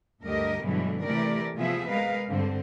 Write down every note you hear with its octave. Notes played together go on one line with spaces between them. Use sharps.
D2 G2 D3 G4 A#4 D#5
G2 B2 D3 E3 F#3 G#3
C3 E3 A3 G4 A#4 D5
C3 F3 B3 F4 G#4 E5
G#3 A#4 B4 F5
G2 D3 C4